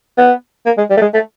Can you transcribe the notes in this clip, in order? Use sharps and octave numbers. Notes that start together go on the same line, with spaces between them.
B3
A#3
G#3
G3
A3
G#3
A3